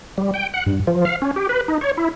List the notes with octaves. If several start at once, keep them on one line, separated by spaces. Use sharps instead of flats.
G3
G5
F#5
G2
F3
F5
C#4
G4
B4
D#4
C#5
E4